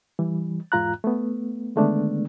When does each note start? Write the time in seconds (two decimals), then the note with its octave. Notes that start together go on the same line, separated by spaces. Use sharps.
0.19 E3 G3
0.72 E2 G#2 F4 A#5 F#6
1.04 A3 B3
1.76 D3 D#3 G#3 A3 B3 D4